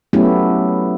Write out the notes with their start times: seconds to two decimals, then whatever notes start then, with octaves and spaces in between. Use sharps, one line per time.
0.13 F#3 A3 B3 C#4 E4 G4